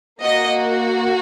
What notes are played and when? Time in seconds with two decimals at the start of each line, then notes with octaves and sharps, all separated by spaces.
0.22 A#3 F#4 D#5